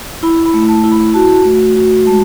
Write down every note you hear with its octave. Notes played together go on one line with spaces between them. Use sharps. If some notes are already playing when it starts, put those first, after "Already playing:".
E4 B5
B5
A3
A5
E4
B5
F#4 A5
A3
F#4
G#3 A5